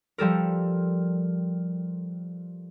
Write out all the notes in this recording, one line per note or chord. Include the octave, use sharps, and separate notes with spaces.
F3 G3 A4 A#4